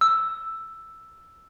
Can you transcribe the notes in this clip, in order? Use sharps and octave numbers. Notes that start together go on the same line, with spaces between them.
E6